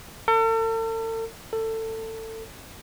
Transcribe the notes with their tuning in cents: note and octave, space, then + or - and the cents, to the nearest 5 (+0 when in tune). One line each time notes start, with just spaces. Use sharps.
A4 +40
A4 +20